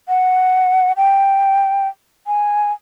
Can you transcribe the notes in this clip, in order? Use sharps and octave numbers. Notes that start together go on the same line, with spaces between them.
F#5
G5
G#5